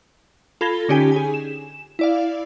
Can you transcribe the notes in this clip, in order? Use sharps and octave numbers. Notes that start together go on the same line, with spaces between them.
F4 A4 B5 G#6 A#6 G7
D3 C#4 D#4 G4 G#5 B6
G#4 G#5
E7
E4 D5 F5